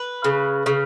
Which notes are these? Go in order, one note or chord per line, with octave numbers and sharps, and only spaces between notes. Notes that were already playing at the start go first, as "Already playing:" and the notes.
Already playing: B4
C#3
C#3